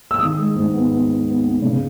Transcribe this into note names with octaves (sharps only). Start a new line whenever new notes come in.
E6
D#3 D#6
G#3
G#2
B3
B3
B3
B3
B3
C#3